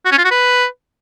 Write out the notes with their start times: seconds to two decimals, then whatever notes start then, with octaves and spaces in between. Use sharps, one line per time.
0.05 F#4
0.11 C#4
0.18 F4
0.24 F#4
0.31 B4